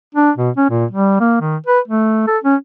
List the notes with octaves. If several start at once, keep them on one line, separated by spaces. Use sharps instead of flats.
D4
B2
C#4
A#2
G3
A#3
D#3
B4
A3
A4
C#4